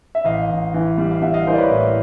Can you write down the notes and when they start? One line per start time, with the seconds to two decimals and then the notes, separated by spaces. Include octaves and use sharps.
0.15 E5
0.25 A1 D#5 F5
0.50 A1
0.74 E3
0.98 G3
1.11 F5
1.22 G3 E5 F#5
1.34 D#5 F5
1.47 E3 A#4 C5
1.54 D5
1.58 B4 C#5
1.70 A2